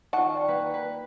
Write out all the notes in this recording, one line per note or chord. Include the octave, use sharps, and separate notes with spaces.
D#3 F4 F#5 A5 C#6
D5 G5
A#3 B4
B4